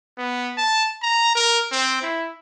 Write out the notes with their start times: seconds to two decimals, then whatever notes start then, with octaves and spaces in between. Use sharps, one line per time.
0.18 B3
0.58 A5
1.02 A#5
1.35 A#4
1.72 C4
2.02 E4